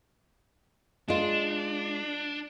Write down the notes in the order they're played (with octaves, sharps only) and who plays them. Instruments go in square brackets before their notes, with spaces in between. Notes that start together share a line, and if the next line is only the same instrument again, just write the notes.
[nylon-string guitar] G#3 F4 [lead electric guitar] D4